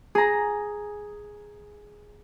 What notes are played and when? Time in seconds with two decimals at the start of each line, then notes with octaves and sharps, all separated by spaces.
0.15 G#4 A#5